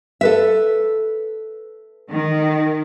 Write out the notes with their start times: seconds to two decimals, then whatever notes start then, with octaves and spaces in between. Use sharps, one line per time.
0.21 A4 B4 E5
2.11 D#3